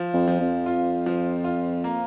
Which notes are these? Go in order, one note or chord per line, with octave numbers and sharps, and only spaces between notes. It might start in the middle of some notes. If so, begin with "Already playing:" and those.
Already playing: F3
F2
F3
F2
F4
F3
F4
A#3